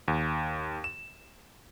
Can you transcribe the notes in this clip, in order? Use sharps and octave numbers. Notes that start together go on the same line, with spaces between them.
D#2
E7